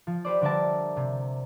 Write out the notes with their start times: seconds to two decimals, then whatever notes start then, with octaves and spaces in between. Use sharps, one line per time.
0.07 F3
0.25 G4 B4 C5 D5
0.42 D3 G3 A#4 D5 E5 A5
0.97 C3